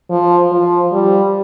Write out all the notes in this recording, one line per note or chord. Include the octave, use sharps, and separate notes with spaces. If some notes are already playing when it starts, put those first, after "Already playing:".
F3
F3
G3